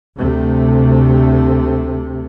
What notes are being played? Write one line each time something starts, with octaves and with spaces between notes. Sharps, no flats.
D2 C3 A3